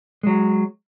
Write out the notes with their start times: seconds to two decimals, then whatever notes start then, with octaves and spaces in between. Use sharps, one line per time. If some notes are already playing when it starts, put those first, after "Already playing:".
0.23 F#3 G#3